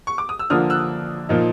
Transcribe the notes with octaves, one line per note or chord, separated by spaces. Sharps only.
C#6
D6
D#6
E6
D3 F3 A#3 D4 D#6 F6
E6 F#6
A#2 F3 A#3 D#4